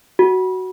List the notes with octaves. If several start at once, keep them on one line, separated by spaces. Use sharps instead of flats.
F#4